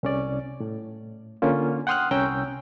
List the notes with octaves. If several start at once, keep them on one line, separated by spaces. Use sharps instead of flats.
C2 C#4 D5
A2
D3 A#3 C#4 F4
F#5 G5 C6 D#6 F6 F#6
C2 C#4 G5 A#5 E6 G6